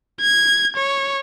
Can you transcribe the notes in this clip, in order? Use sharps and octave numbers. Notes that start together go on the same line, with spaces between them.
G#6
C#5